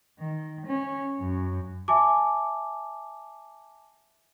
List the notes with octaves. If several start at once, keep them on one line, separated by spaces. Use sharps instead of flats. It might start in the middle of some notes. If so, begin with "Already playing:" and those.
D#3
C#4
F#2
E5 G#5 A5 D6